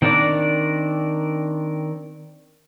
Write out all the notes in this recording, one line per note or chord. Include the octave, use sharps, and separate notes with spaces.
D#3 C4 D4 A#4 D5